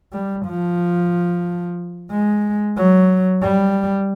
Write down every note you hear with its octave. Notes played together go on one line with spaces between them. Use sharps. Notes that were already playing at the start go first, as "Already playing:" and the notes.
G3
F3
G#3
F#3
G3